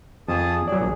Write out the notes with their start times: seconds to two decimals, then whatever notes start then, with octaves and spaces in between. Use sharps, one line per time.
0.28 F2 G#4 A5 D#6
0.68 F#3 G#4 D5
0.81 A#1